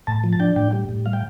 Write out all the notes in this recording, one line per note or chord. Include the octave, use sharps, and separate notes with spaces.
A2 A5
F3
A5
D4 G5
A2 G5
G3
A2
F5
G5